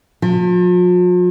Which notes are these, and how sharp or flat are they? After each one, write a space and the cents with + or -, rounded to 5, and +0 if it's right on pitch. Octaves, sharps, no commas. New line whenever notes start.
F3 +45